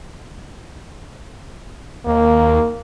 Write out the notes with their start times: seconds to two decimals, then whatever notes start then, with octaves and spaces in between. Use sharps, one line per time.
2.06 D#2 A#3